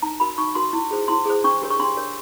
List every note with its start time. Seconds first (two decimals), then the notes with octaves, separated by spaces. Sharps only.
0.02 D#4 A#5
0.20 F#4 A#4 B5
0.38 D#4 C#6
0.55 F#4 A#4 C6
0.73 E4
0.91 G#4 C5
1.08 E4 C6
1.26 G#4 C5
1.44 D4 C#6
1.62 G4 A#4 C#5
1.71 C#6
1.79 D4 C6
1.97 G4 A#4 C#5